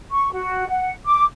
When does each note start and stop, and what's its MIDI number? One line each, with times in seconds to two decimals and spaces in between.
0.10 0.30 85
0.32 0.67 66
0.68 0.93 78
1.06 1.23 86